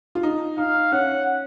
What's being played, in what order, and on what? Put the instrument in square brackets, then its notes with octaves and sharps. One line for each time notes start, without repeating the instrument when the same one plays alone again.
[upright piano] F4
D#4
[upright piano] D#4 [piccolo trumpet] F5
[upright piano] C#4 [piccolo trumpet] F#5